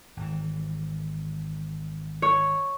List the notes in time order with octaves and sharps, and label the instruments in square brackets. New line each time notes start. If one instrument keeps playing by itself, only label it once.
[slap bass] G#1 E3
[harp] C#5